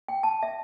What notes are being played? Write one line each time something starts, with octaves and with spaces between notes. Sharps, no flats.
G5
A5
E5